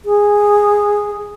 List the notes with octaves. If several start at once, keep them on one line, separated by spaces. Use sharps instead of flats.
G#4